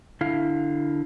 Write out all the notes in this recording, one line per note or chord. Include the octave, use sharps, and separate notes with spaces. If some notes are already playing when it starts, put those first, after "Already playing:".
D3 E4 F5